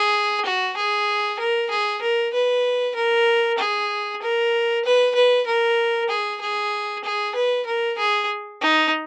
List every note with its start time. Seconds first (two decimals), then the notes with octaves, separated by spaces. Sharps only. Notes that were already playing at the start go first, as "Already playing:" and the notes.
Already playing: G#4
0.45 F#4
0.77 G#4
1.39 A#4
1.70 G#4
2.02 A#4
2.34 B4
2.96 A#4
3.58 G#4
4.22 A#4
4.85 B4
5.15 B4
5.47 A#4
6.10 G#4
6.41 G#4
7.04 G#4
7.35 B4
7.66 A#4
7.98 G#4
8.61 D#4